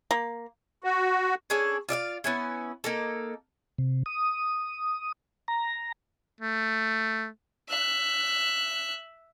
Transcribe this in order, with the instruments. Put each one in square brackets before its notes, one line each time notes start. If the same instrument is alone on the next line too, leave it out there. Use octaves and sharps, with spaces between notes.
[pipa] A#3
[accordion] F#4
[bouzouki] C#4 D4 G#4 A4
F4 D5 E5 F5
B3 C#4 E4
A#3 D#4 A4
[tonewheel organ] C3
D#6
A#5
[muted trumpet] A3
[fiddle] E5 F#6